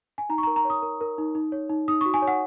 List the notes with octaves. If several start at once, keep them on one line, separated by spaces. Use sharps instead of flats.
G#5
D#4 A#5
C#6
A#4 A#5
A#5
C#5
D#6
A#4
A#4
D#4
D#4
C#5
D#4
D#4 D#6
C#6
F#4
G#5
C#5
F#5